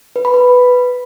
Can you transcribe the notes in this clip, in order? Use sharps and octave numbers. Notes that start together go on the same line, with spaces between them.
B4
B5
B4